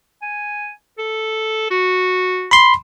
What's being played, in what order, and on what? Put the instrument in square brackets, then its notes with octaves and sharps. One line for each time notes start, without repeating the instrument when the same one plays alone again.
[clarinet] G#5
A4
F#4
[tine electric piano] B5 C6